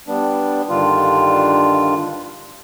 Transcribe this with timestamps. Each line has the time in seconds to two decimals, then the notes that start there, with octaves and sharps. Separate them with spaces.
0.08 G3 B3 D4
0.70 G2 D3 D#3 G3 D4 F4